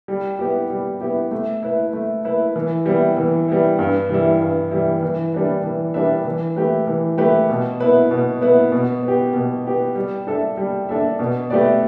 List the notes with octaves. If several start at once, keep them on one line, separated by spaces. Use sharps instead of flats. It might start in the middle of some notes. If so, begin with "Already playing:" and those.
G3
B3 E4 G4
G3
B3 E4 G4
A3
E4 B4
A3
E4 B4
E3
G3 B3 E4
E3
G3 B3 E4
G2
E3 G3 E4
G2
E3 G3 E4
E3
G3 D4 B4 E5
E3
G3 D4 B4 E5
E3
A3 G4 B4
E3
A3 G4 B4
B2
B3 E4 B4
B2
B3 E4 B4
B2
B3 G4
B2
B3 G4
G3
D4 A4 E5
G3
D4 A4 E5
B2
A3 G4 B4 D5